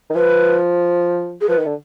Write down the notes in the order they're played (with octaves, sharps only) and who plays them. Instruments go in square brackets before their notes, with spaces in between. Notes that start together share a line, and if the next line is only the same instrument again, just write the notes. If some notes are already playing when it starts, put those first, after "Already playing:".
[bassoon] D#3
[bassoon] F3 [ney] B4
[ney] G#4
[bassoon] F3 [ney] B4
[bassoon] D#3
D3